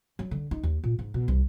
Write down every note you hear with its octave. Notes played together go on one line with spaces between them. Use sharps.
F#3
D3
D#4
D#2
A#2
G#2
B2
C2